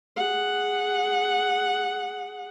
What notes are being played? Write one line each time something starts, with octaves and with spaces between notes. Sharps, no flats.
G#4 F#5